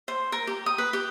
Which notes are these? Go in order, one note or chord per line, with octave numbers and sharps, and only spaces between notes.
C5
A#4
G4
D#6
B4
G4